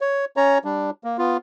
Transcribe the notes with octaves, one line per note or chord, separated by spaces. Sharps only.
C#5
C#4 C#5 A#5
G3 D4
A#3
B3 F4